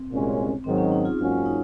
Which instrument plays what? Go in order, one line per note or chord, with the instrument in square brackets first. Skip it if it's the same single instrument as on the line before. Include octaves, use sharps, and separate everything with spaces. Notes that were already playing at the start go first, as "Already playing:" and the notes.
Already playing: [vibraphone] C4
[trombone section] C2 A#2 G#3 C#4
[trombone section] G#2 D#3 F#3 [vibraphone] C4
[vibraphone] C#4
D#4
F4 G#4
[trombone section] G#2 F#3 A#3 C#4 F#4 [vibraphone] F4
[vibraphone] D#4